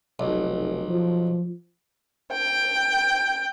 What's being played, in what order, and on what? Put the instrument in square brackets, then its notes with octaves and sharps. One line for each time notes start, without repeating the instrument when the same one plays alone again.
[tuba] F1 [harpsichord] B1
[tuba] F3
[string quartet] G5